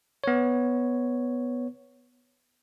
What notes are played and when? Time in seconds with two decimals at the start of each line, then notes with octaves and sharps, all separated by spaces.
0.24 B3 C#5